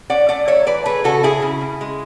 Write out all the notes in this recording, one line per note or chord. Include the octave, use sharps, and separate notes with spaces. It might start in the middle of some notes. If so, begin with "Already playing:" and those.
C#4 D5 F#5
A3 D5 F#5
F#3 C#5 E5
E3 B4 D5
A3 G#4 B4
C#3 F#4 A4
C#3 E4 G#4
C#3
C#3
G#3